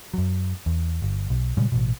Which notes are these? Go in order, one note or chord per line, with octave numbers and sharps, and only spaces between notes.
F#2 F#3
E2
G1
B1
A#2 C#3 G3 G#3
A1 B2